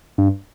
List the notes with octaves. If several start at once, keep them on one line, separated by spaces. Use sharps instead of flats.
G2